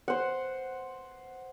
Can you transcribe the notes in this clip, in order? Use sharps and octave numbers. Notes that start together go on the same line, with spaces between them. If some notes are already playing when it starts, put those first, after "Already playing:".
C5 F#5